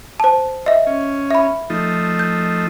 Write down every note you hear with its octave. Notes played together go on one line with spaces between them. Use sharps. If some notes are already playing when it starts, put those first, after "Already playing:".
C5 A5
D#5 E5
C#4
E5 B5
F3 A3 D#4
G6